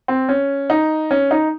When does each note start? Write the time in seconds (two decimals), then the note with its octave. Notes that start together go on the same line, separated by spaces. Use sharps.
0.08 C4
0.29 C#4
0.70 D#4
1.11 C#4
1.31 D#4